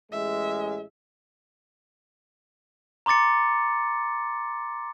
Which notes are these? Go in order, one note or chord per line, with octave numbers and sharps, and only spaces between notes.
A1 G#3 G#4 E5
A#5 C6 D6 A6 C#7